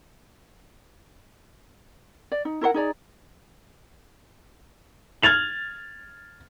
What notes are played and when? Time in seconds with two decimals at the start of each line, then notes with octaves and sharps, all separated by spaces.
2.32 D5
2.45 D#4
2.61 E4 A#4 C5 F#5
2.74 D#4 G#4 D5 A#5
5.22 F6 G#6 A6 F7 F#7